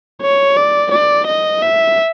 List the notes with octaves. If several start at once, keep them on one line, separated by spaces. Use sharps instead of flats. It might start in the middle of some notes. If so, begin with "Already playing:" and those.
C#5
D5
D5
D#5
E5